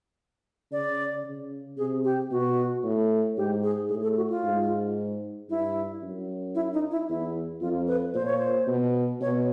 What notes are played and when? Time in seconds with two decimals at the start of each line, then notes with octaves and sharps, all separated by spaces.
0.71 C#3 D5
1.25 C#3
1.78 C3 G#4
2.04 G4
2.31 B2 F#4
2.84 A2
3.37 G#2 G4
3.63 G#4
3.89 A2 G#4
4.03 A4
4.17 F#4
4.30 F4
4.43 G#2
5.49 G2 E4
6.02 F#2
6.55 E4
6.73 D#4
6.91 E4
7.09 E2 E4
7.61 F2 F4
7.88 B4
8.14 A#2 C5
8.26 C#5
8.38 C5
8.67 B2
9.21 B2 C#5